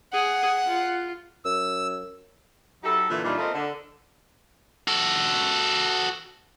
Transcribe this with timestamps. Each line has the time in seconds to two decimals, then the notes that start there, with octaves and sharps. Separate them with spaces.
0.13 G#4 F#5
0.66 F4
1.45 F#2 E6
2.84 F#3 D#4 E4 G4 A4
3.09 A#2 D3 E3
3.24 A#2 E3 G3 D4 D#4 F4
3.38 A3 A#3 C4 F4 A#4 D#5
3.54 D3
4.87 F#4 A4